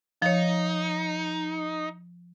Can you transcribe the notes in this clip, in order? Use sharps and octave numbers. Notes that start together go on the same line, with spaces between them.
F3 D#4 C#5